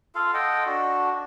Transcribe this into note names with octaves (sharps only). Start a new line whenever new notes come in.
F4 A4 F5
A4 D#5 F#5 G5
D4 F#4